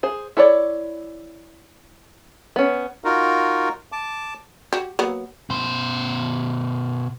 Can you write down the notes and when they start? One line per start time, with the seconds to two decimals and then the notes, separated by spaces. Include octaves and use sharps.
0.03 G#4 C5
0.37 E4 A4 C#5 D5
2.56 B3 C#4
3.04 D#4 F4 F#4 A#4
3.92 A5 D6
4.73 F#4 G4
4.99 F#3 A#3 B3
5.50 B2 C5